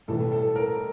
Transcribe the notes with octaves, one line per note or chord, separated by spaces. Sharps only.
B1 A2 E3 G3 A4
A4
A#4